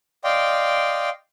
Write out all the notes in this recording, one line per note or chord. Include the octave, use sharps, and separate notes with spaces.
D5 D#5 F5 G5 C6